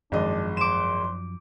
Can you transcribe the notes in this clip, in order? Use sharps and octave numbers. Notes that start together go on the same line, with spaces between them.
G#1 F#2 F3 G#3 D4 D#5
C5 D6 E7